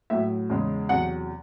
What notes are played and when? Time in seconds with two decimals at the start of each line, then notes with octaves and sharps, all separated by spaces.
0.10 A2 F#3 E5
0.50 E2 C#3 G#3
0.89 E2 C3 F#3 F#5